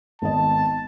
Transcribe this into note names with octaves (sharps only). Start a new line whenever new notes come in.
G#1 B3 D#5 A5